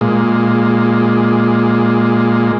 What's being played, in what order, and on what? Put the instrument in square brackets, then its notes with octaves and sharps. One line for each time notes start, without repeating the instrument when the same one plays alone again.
[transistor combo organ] A#2 G#3